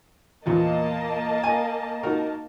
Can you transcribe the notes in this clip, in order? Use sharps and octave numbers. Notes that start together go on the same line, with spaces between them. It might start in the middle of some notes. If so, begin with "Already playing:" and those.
E2 A#2 F3 A#3 D#5 A5
G#5
D#4 F#4 A#4